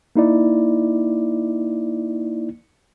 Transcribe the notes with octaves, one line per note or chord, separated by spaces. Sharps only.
A#3 D#4 E4 D5